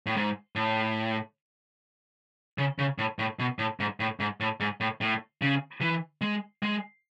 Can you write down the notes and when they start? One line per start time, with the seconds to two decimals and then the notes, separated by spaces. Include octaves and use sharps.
0.06 A2
0.16 G#2
0.56 A2
2.58 C#3
2.79 C#3
2.98 A2
3.19 A2
3.39 B2
3.59 A2
3.80 G#2
4.00 A2
4.20 G#2
4.40 A2
4.60 G#2
4.81 A2
5.01 A2
5.42 C#3
5.81 E3
6.21 G#3
6.63 G#3